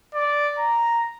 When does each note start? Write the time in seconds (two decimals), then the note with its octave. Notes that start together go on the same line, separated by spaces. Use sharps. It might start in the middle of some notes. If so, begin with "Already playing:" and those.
0.15 D5
0.59 A#5